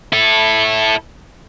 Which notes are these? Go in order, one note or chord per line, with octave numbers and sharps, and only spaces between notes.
E4 A4